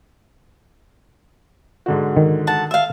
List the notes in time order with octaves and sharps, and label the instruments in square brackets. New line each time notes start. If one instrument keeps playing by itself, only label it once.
[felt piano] G#2 D3 F#4
[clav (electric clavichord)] D#3
[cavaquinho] F#5 A5
E5 F5